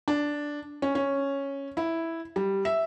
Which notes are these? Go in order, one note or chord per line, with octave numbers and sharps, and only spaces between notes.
D4
C#4
C#4
E4
G3
E5